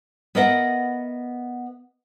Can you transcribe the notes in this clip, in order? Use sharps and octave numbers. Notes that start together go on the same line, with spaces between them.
B3 A#4 B4 D#5 E5 F#5